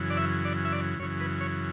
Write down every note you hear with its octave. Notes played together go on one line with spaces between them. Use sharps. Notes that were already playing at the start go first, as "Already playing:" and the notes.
Already playing: F#2 C#3 E3
D5
E5
D5
E5
D5
F#2 C#3 E3 C#5
B4
C#5